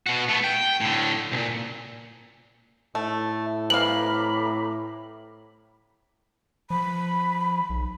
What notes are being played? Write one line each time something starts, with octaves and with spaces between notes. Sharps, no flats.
B2 F#4
A3 B3
G5
A2 D3
C2 A#2
A2 A3
C3 E3 F5 A#5 B5 D6 F#7
F3 B5
B1